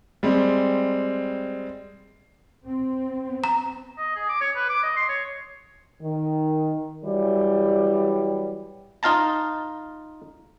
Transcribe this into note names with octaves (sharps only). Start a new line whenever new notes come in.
G3 G#3 C4
C4
A#5
D#5
G#4
D6
C#5
B4
D6
D#5
C6
C#5
D#3
E3 F#3 G3
D#4 F4 F5 A5 A#5